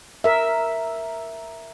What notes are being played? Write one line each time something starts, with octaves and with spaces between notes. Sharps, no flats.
A#4 E5